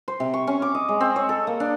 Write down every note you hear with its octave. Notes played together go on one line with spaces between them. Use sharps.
C5
C3
C#6
C#4
D6
D#5
G#3
C4
C#5
A4
A#3
D4